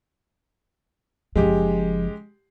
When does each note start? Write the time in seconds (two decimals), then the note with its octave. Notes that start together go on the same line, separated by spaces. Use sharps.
1.36 F#1 F3 G#3 G4